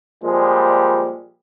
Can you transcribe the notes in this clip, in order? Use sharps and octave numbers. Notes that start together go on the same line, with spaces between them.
A#2 F3 G3 G#3